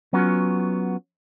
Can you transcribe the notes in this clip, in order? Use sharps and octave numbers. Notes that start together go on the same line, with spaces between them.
F#3 B3 C#4 F4 F#4